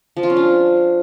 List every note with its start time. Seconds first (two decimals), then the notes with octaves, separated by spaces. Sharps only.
0.17 F3
0.23 F4
0.30 C#4
0.37 D4